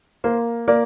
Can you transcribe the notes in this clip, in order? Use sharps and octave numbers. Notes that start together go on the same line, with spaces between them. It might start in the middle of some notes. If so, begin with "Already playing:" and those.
A#3 C5
A#3 D5